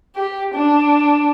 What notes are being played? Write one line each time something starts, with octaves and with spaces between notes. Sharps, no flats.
G4
D4